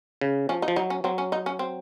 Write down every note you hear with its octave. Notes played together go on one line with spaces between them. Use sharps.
C#3
F3 C#4
D#4
F3
F#3 D#4
C#4
F#3 C4
C#4
D#4
C#4
C4